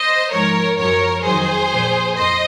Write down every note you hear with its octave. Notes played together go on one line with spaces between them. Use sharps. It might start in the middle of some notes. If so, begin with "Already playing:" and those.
Already playing: C5 D#5
G#2 F3 A#4 C#5
F#2 F3 A#4 C#5
F2 D#3 F#3 G#4 C5
A#2 F3
F2 C5 D#5